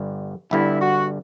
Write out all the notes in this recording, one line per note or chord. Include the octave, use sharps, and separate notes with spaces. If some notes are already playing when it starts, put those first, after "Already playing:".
Already playing: G1 G2 D3
G1 G2 D3 E4
F#4